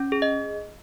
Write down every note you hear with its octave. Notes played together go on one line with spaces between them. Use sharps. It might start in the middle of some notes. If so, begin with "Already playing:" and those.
Already playing: C#4
G#4
D#5